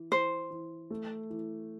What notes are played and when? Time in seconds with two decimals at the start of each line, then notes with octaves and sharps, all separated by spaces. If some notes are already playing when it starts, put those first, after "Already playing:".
Already playing: E3
0.11 E3 C5
0.50 E3
0.90 A3
1.30 E3